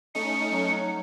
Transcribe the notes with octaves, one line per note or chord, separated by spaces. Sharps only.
A3 C#4 D#4 C#7
F#3